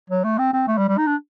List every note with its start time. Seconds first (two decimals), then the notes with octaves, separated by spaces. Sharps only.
0.10 F#3
0.24 A3
0.38 C4
0.53 C4
0.68 A3
0.78 G3
0.88 G3
0.98 D#4
1.07 D4